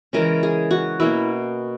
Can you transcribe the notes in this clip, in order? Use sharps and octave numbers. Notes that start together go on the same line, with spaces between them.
C#3 E3 G#3 C#4 A#4
G#4
F#4
B2 A#3 C#4 E4